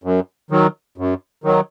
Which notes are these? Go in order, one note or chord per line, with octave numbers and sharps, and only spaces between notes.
F#2
D#3 F#3
F#2
D#3 F#3